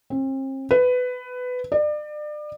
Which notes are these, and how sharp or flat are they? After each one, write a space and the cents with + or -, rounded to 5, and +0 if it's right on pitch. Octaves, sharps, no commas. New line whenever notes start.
C4 +40
B4 +15
D5 +35